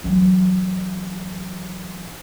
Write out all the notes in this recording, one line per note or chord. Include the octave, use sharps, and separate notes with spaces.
E3 F#3